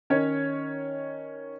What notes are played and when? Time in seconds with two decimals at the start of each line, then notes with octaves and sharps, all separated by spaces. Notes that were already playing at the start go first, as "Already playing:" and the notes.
0.10 D#3 C#4 C#5